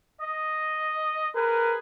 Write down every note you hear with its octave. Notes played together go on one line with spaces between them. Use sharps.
D#5
G#4 A#4 B4